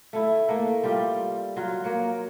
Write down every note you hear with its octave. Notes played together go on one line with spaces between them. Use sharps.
A3 E4
A3 A#3
G3 F4 D5
F#3 F4
A#3 C#5